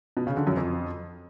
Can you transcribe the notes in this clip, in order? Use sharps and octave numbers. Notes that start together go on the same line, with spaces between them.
B2
C#3
D3
F#2
F2